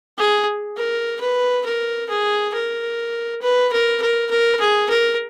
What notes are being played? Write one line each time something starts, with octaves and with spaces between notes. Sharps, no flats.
G#4
A#4
B4
A#4
G#4
A#4
B4
A#4
A#4
A#4
G#4
A#4